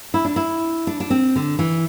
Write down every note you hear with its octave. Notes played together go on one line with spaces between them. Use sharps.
E4
D4
E4
D4
D4
C4
D3
E3